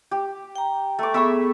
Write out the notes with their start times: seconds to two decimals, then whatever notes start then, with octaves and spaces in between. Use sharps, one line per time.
0.11 G4
0.56 G5 A#5
0.99 A3 D6
1.14 B3 G#4 E5 B5 C#6